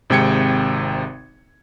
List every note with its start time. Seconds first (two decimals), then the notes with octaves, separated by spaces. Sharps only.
0.10 G#1 C3 G#3 G5 G#6 C#7